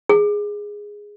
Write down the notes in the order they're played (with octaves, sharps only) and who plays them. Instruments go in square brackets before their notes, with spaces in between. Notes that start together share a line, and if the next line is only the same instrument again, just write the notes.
[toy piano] G#4